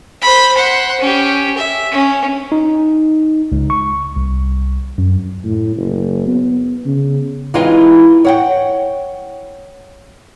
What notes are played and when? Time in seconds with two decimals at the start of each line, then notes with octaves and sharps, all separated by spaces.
0.22 C5 B5
0.55 C5 F#5
1.00 C#4 G4
1.57 E5
1.92 C#4
2.52 D#4
3.52 C#2
3.70 C#6
4.16 C2
4.98 F#2
5.44 A2
5.76 F#1
6.27 B3
6.85 C#3
7.54 E3 G#3 C4 D#4 F4
8.25 C#5 F#5 G5